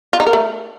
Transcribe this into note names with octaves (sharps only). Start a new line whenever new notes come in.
F4
D#4
A#4
A3